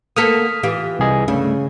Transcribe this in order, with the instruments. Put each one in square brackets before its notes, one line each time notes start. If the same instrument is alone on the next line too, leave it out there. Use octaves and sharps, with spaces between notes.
[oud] A#3 B3 A4 [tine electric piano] D#6 F6 B6
[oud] E3 F4 G4
[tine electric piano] C2 G#4 D#5
[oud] G2 A3 [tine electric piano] C#3